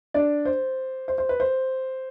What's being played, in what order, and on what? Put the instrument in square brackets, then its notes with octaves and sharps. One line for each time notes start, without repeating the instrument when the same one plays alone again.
[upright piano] D4 D5
C5
C5
C5
B4
C5